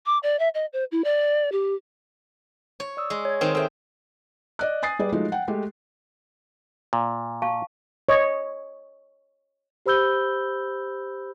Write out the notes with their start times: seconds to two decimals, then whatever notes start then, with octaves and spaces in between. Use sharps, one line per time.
0.06 D6
0.23 D5
0.39 E5
0.54 D#5
0.73 C5
0.92 E4
1.04 D5
1.52 G4
2.80 C#5
2.97 D5 D#6 E6
3.10 G#3
3.25 C#5 G#6
3.41 D#3 C4 C#5 D#5
3.55 C4 A4 E5 G5
4.59 D5 D#5 F#6
4.83 G#5 D#6 A6 C7
4.99 G3 G#4 B4 D5
5.12 F3 F#3 G#3 A3 D#4
5.32 F#5 G5
5.48 G#3 A3 G4
6.93 A#2
7.42 F5 A5 C#6
8.09 C#5 D#5
9.86 G4 C5 B5 E6 G6 G7